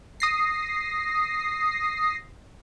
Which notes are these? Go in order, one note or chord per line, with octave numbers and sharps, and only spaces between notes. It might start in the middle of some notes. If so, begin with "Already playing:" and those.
D#6 A#6 C7